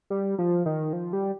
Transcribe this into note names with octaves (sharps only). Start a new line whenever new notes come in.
G3
F3
D#3
F3
G3